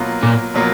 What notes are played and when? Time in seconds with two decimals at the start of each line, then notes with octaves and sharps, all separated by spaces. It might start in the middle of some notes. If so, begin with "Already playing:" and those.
Already playing: B2 F#3 A#3 F4
0.23 A#2
0.54 B2 F#3 A#3 F4